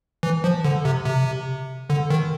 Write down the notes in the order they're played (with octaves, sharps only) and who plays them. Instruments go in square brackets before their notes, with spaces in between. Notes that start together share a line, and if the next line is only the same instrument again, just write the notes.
[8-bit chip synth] E3
F3
D3
C3
C3
D3
D#3